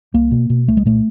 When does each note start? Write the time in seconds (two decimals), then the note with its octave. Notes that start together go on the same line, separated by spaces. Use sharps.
0.14 C2 A#3
0.31 B2
0.50 B2
0.67 C2 A3
0.77 G#3
0.85 A#2 A3